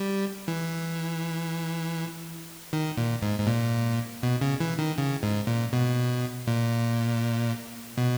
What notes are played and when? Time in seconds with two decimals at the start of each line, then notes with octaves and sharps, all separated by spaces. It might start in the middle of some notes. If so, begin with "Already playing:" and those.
Already playing: G3
0.48 E3
2.73 D#3
2.98 A#2
3.22 G#2
3.39 G#2
3.47 A#2
4.23 B2
4.41 C#3
4.60 E3
4.79 D#3
4.98 C#3
5.23 G#2
5.47 A#2
5.73 B2
6.47 A#2
7.97 B2